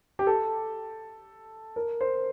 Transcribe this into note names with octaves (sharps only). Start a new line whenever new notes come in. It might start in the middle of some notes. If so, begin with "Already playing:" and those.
G4
A4
A#4
C5